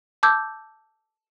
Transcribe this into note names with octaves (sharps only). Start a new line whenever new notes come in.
A5 D6 E6 G6 G#6